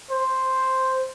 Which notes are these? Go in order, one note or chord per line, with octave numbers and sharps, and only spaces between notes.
C5